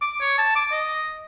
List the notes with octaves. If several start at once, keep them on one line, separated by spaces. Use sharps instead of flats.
D6
C#5
A5
D6
D#5